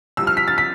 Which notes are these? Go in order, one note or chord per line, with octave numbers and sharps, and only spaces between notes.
C2 C3 F3 E6
F6
B6
A6
B6